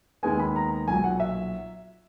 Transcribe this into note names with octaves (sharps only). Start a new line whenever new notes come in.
D#2 D#3 G#3 B3 G#5
B5
A#5
B1 A#2 F#3 G#5
F#5
E5